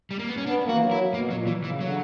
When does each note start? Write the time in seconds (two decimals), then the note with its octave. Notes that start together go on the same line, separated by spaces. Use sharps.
0.11 G3
0.19 A#3
0.29 B3
0.37 C#4
0.46 B3 D4
0.64 A#3
0.69 F#4
0.74 E3
0.81 F#3
0.91 E4
1.14 B2 A#3
1.30 A#2 F#3
1.47 E3
1.64 C#3 E3
1.81 D3 F#3